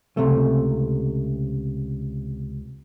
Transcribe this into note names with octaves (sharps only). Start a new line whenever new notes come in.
C#2 C3 A3